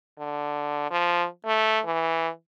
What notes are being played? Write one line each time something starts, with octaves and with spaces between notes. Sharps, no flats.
D3
F3
A3
E3